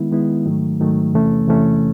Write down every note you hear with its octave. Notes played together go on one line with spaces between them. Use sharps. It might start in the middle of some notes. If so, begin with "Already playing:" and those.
Already playing: D#3 G#3 B3 E4
D#3 G#3 B3 E4
G#2 D#3 F#3 A3
G#2 D#3 F#3 A3
E2 C3 E3 A3 C#4
E2 C3 E3 A3 C#4